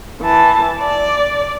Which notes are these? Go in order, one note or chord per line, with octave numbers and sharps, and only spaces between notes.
E3 A5
D5